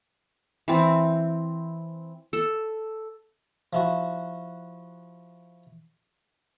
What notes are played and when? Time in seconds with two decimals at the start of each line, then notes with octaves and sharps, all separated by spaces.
0.68 E3 C4
2.33 A4
3.73 F3 E4 F#4